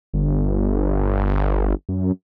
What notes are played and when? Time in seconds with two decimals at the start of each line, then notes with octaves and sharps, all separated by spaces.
0.14 G1
1.89 F#2